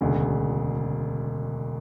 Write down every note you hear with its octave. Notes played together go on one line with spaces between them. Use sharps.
E1 D2 C#3